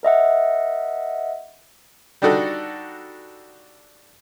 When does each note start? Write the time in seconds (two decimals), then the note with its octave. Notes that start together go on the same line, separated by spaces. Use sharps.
0.03 A#4 D#5 E5 F#5
2.22 G3 D4 D#4 F#4 A4